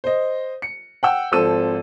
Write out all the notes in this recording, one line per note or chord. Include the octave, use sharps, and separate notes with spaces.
C5 D#5
C#7
F#5 G5 E6
G#1 F3 C4 A4 E6 D#7